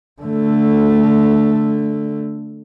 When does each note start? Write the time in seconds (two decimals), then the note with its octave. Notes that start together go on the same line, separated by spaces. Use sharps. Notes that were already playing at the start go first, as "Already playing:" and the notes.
0.22 D3 A3